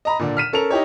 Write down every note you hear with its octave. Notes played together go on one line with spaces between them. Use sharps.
D#5 A#5 B5
A#2 D3 D4
F6 B6 D#7 E7
C#4 A4 A#4 F7
D#4 E4 G4 C#5